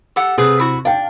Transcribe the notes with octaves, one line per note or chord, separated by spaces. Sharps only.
G4 A4 F#5
C3 A3 G#4 B4
E4 F#4
D4 F5 G5